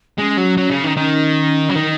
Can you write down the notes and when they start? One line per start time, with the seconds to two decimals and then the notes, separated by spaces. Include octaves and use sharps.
0.18 G#3 C#4
0.38 F#3
0.58 F#3
0.71 C#3
0.84 D#3
0.97 D#3 C#4
1.69 F#3
1.75 D#3 D#4